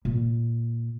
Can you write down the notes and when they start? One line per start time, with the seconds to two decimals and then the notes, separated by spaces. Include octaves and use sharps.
0.05 A#2 A#3